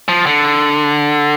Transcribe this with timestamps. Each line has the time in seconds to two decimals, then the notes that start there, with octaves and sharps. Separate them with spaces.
0.08 F3
0.26 D3